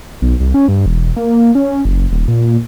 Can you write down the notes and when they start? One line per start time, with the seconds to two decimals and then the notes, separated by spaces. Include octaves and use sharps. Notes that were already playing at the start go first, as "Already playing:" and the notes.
0.22 B1
0.40 C2
0.54 C#4
0.68 G2
0.86 E1
1.16 A#3
1.55 C#4
1.85 F#1
2.11 D#1
2.28 A#2